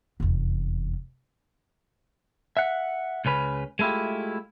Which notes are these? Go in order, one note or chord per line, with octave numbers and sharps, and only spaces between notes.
F1 E2
E5 F#5
C#2 C#3 C#4 B4
G#3 A3 E4 F4 G4